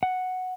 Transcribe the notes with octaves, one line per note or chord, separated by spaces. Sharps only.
F#5